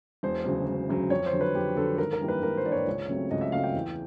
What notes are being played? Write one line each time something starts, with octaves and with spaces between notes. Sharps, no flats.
E1 C5
D2 C#3 F#3
E1
D2 C#3 F#3
F2 C#5
C5
D3 F#3
B4
F2 G4
D3 F#3 A4
G#1 A#4
A#4
G2 E3 G3 A#3
B4
G#1 A#4
C5
G2 E3 G3 A#3 D5
C#5
C#2
C#3 F#3 A3 C4
C#2 D#5
E5
C#3 F#3 A3 C4 F5
G5
E2